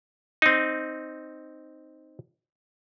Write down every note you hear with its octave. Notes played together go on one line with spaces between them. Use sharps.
C4 D#4